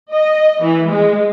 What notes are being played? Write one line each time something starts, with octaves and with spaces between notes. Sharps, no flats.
D#5
E3
G#3